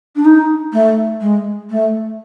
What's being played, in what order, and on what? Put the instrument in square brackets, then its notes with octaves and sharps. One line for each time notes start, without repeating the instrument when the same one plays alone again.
[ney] D4
D#4
A3
G#3
A3